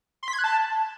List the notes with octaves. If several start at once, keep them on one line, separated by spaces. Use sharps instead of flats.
C6
B6
G#6
F#6
A5